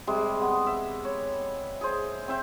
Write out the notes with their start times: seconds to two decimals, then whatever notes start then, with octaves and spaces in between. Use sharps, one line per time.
0.07 C3 G3 G#3
0.41 B3
0.66 E5
1.05 C#5
1.81 G#4 C5
2.28 C4 C5 E5 G5